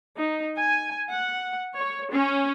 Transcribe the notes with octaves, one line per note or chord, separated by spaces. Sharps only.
D#4
G#5
F#5
C#5
C#4